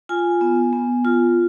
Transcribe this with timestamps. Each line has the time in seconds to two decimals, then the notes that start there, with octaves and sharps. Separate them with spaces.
0.09 F4 G#5
0.41 B3
0.73 B3
1.05 F4